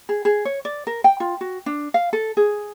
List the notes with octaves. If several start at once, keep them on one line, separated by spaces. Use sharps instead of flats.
G#4
G#4
C#5
D5
A#4
G5
F4
F#4
D4
F5
A4
G#4